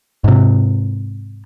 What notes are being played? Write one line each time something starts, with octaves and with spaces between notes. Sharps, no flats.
G#2 C3